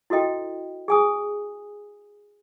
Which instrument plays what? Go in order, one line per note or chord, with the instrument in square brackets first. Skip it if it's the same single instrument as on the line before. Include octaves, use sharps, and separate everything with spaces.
[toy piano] E4 F#4 A4 D#5 G5
G#4 G#5 D#6